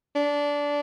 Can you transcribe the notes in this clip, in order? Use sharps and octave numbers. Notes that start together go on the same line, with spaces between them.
D4